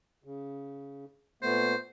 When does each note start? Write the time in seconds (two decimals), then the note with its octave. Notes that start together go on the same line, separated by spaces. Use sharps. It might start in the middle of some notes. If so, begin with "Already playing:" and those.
0.24 C#3
1.43 A#2 A3 B3 C5